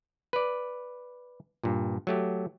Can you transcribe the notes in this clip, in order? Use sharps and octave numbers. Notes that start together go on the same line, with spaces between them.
B4 D5
G2 A#2
F#3 A3 G4